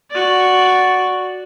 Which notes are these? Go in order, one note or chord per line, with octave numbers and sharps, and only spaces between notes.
F#4 D5